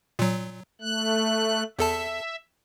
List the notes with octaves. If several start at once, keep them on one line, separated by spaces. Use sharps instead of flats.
A#2 F#3
A3 F#6
E2 A4 E5 A5